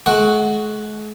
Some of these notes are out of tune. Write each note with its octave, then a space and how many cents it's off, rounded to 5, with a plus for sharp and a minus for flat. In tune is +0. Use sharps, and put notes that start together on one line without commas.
G#3 +45 F#4 +0 F#5 +0